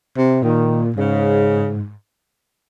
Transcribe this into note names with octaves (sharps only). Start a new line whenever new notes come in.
C3
A#2 D#3
G#2 C#3